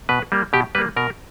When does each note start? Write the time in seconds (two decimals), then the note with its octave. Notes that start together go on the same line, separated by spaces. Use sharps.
0.09 B2 B4
0.32 G3 A#3
0.53 B2 G4
0.75 G3 A#3 B4
0.96 B2 A#4